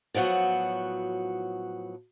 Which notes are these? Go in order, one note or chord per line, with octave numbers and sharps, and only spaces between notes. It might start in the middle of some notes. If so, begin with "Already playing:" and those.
A2 F3 F#3 B3 F#4